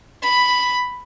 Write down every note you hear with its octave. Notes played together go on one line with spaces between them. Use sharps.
B5